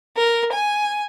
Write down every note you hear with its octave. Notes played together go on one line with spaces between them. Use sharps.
A#4
G#5